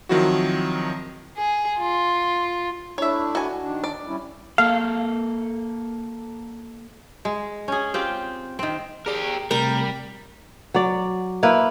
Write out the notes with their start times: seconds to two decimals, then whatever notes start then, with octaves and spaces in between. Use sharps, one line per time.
0.09 D#3 F3 F#3 C4 E4 F#4
1.37 G#4
1.79 F4
2.98 A3 D4 E4 C#5 E5
3.35 F#4 G#5
3.62 D#3 D4
3.84 D5
4.06 G3 C#4 E4
4.58 A#3 A4 F5
7.25 G#3
7.68 C#4 G#4
7.94 C4 F4 G4
8.59 D#3 C4
9.06 G4 G#4 A#4 D5 A#5
9.51 C3 G3 A3 A#4
10.74 F#3 D5
11.43 A#3 E4 B4